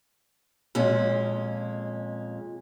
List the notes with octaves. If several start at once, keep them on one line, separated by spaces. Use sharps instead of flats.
F2 A#2 G#3 C#4